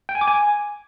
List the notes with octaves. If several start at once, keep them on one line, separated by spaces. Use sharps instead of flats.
G5
G#5
D6
G#5